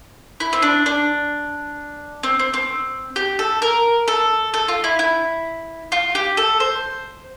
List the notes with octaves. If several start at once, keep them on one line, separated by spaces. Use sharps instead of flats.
E4
C4
D4
D4
C4
C4
C4
G4
A4
A#4
A4
A4
F4
E4
E4
F4
G4
A4
C5